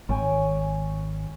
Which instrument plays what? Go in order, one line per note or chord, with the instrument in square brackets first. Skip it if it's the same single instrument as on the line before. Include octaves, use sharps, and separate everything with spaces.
[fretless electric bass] G#1 [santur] C#5 G5 G#5